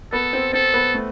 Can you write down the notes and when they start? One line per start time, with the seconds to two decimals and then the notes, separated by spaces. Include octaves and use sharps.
0.13 B3 A4
0.33 C4
0.53 C4 A4
0.74 B3
0.94 A3